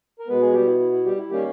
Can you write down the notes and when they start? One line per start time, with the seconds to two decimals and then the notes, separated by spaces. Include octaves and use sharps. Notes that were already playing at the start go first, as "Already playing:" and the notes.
0.20 A#4
0.27 B2 G#3 B3 B4
0.40 G#3 G#4
0.53 G3 G4
0.66 E4
0.79 E4
0.92 E4
1.05 G3 G4
1.17 E4
1.29 D#3 G3 A#3 C#4 G4